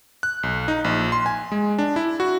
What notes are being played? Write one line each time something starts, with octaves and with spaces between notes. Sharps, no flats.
F#6
B1
D#4
A#1
C6
G#5
G#3
D4
E4
F#4